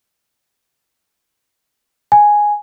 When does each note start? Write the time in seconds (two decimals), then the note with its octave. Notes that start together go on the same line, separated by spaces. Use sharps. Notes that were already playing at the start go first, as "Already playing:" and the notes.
2.12 G#5